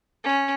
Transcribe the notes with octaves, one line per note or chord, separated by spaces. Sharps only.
C#4